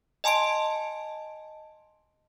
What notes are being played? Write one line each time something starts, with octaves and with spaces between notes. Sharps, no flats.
D#5 G#5 A5 C6 D7